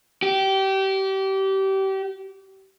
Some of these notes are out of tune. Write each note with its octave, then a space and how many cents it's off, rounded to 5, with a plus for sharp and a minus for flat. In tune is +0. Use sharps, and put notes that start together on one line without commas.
G4 -25